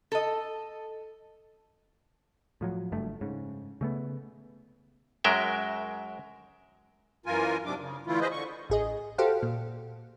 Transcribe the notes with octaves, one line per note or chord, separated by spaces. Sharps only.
A4 D#5
A2 F3 F#3
F#1 G2 A3
G#2 C#3
C#3 A3 B3
F#2 F#3 G#3 A#4 E5 G5
F#2 E3 F4 A#4 G#5
G#2 C3 F#3 D4 D6
C#3
D3 E3 A3 E4 F4
G#4 B4 C5 D#5
D3 C#6
A1 G#4 D#5
F#4 G4 A4 C5 F5 F#5
A#2